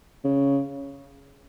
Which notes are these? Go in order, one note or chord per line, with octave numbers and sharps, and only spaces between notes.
C#3